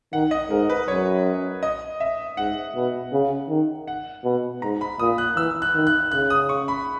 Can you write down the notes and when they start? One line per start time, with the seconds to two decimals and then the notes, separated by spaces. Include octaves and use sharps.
0.13 D#3 F#5
0.31 D#5
0.50 G#2 A#4
0.70 B4
0.88 F#2 C#5
1.63 D#5
2.00 E5
2.37 G#2 F#5
2.76 B2
3.12 C#3
3.49 D#3
3.87 F#5
4.25 B2
4.62 G#2 A#5
4.81 B5
4.99 A#2 D#6
5.18 F#6
5.37 E3 E6
5.62 F#6
5.75 D#3
5.87 F#6
6.12 C#3 F#6
6.30 D#6
6.49 C#6
6.68 B5